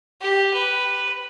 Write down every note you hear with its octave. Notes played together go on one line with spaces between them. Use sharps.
G4
B4